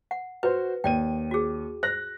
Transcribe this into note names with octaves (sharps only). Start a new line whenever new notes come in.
F#5
F#4 B4 C5
D#2 D5 G5 D#7
F#4 G#4
C5 F#6 A#6